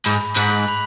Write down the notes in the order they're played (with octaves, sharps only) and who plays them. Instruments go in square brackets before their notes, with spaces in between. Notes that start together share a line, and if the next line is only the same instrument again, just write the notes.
[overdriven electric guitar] G#2 [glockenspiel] B5
[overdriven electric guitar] G#2 [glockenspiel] F#6 B6 F#7
[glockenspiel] B5